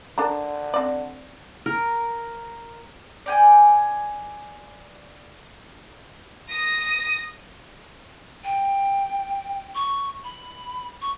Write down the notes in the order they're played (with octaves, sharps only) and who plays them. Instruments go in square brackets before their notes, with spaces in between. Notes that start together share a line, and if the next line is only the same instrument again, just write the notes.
[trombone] D3 [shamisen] D4 A4 A#4
[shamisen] C4 D5
[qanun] A#4
[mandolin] D5 G5 G#5
[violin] D#6 A#6
[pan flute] G5
C#6
B5
C#6